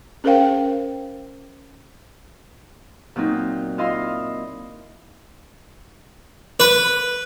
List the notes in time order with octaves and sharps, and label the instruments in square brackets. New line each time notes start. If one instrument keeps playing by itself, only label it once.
[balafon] C#4 G#4 A#4 C5 F5 G5
[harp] A#2 F#3 C4 D#4
E4 F4 D#5 F5 C6 E6
[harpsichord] B4